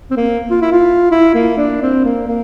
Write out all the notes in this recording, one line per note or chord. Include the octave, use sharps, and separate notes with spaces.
C4
A#3
F4
E4
F4
E4
A#3
D4
C4
A#3
A#3